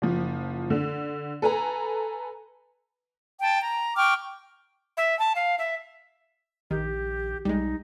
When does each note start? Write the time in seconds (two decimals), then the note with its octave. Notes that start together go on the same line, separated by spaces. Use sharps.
0.02 F#1 F3
0.70 D3
1.42 A4 B4 G#5 A#5
3.41 G5 A5
3.61 A#5
3.95 G5 C#6 D6 F6
4.97 E5
5.19 A5
5.35 F5
5.59 E5
6.71 A#1 D#3 G4
7.45 B1 G3 G#3 D#4